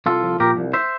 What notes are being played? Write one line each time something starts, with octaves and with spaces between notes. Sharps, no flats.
C2 F4 A4
F3
A#2 G4 A#4
C2
C5 E5